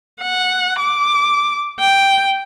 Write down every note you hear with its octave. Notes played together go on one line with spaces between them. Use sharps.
F#5
D6
G5